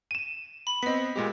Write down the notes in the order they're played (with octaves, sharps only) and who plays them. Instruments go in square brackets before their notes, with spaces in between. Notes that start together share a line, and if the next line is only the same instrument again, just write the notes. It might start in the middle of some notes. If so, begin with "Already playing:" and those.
[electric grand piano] D#7 E7
[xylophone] B5
[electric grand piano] B3 C4 [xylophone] D#5 B6
[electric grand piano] A#2 G#3 G4